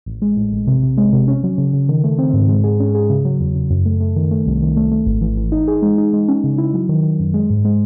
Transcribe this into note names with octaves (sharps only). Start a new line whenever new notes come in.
A1
G#3
A2
A1
C3
C3
G#3
C3
C#4
F#3
C#3
C#3
D#3
A3
C4
G#2
G#3
G#4
C#4
G#4
C#3
F#3
E2
C#3
F#2
A3
A3
D#3
A3
C2
D#3
A3
A3
G#1
E3
E3
D#4
G#4
G#3
D#4
G#3
C#4
C#3
E4
F#3
D#3
D#3
F#2
G#3
G#2
G#3